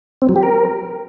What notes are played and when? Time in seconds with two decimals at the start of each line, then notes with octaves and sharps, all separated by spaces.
0.22 C4
0.29 F#3
0.36 G4
0.43 A#4